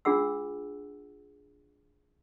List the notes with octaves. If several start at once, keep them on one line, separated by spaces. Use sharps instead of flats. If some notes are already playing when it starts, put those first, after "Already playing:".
D4 F4 G#4 F#5 E6